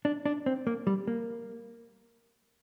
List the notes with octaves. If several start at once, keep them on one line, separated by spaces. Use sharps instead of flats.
D4
D4
C4
A#3
G3
A#3